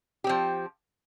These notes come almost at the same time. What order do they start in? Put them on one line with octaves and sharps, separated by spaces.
G4 C4 F3